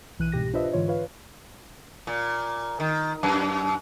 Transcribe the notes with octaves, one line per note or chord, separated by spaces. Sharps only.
B1 E3 F#6 D#7
C2 G#2 B2 G4 A#6
D4 F4 B4 C5 D#5 E5
G#2 D3 E3 F4 C#5
F4 B4 C#5 F5
A#2
D#3
F#2